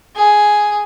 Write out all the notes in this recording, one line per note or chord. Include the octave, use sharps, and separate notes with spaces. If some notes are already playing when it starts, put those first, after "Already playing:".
G#4